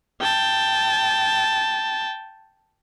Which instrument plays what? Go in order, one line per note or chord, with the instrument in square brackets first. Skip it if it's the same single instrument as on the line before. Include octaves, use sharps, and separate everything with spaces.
[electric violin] G5 A5